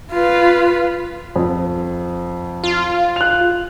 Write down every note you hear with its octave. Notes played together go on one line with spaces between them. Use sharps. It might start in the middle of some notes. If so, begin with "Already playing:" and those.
F4 B4
F2
F4
F#6 F7